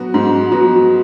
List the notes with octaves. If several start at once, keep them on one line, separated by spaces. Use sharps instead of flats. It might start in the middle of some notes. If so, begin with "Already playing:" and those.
Already playing: F#3 B3 F#4
G#2
F#3 B3 F#4